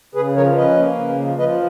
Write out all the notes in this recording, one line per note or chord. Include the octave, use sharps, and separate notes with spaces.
C#3 G#4 B4
F3 A#4 C#5
C#4 B4 D#5
A#3
C#3
F3
F3 B4 D#5